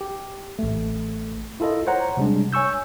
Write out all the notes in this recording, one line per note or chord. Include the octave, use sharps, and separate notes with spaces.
G4
A1 A3
E4 F4 A4 A#4 D#5
C5 C#5 F#5 A#5
C3 G3 G#3 D4
C#5 G#5 C#6 E6 G6